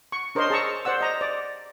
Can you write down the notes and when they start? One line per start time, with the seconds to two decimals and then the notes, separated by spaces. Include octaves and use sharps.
0.12 C#6
0.35 D4 A#4 C5 C#5 D#5 C6
0.50 G#4 A5 A#5 C#6 E6
0.85 C5 D5 F#5 E6
1.01 D#5 A#5
1.21 D5